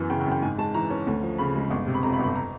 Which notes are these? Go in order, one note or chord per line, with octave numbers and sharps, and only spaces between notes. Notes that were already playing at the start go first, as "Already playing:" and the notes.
Already playing: F#2 E3 B3
C#3 G5
G5
F#2
G5
G#2 G#5
G#3 A5
E3 A#5
C#4
D2
F3
C#3 B5
G#3
G1
C3
B5
F2 A#5
B5
G1
B5
A#5